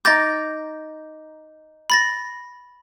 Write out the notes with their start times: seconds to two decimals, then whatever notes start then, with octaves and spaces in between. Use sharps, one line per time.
0.05 D#4 D6 G6 A6 A#6
1.90 B5 A6 A#6